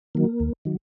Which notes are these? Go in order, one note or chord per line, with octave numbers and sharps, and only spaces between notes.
D#3 F#3 A#3
D#2
D#3 F#3